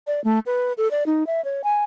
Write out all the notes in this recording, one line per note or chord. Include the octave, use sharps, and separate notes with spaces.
D5
A3
B4
A4
D5
D#4
E5
C#5
G#5